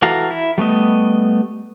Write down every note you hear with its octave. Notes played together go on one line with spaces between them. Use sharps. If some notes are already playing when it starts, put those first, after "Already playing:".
E3 F#4 A4 F5 A#5
E4
G3 A3 B3 D#5